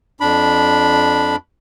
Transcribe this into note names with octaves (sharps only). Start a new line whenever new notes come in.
F2 D4 B5